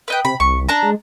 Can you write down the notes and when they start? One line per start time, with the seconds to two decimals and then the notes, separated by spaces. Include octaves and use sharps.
0.08 B4 D#5 G5
0.25 C3 B5
0.40 C2 C#6
0.69 D4 A5 A#5
0.83 G#3